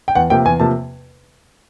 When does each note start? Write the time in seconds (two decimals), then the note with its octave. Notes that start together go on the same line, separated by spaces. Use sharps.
0.08 G5
0.15 E2 F#5
0.30 C3 F3 A#3 G5
0.45 E2 G#5
0.60 C3 F3 A#3 A5